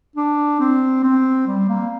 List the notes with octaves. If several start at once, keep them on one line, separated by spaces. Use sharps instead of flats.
D4
C4
C4
G3
A#3